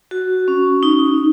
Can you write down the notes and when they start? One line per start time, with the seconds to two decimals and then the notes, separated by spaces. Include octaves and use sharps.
0.11 F#4
0.48 C#4
0.83 D#4